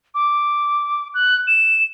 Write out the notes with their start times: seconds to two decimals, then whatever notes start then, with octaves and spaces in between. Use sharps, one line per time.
0.14 D6
1.14 F#6
1.47 E7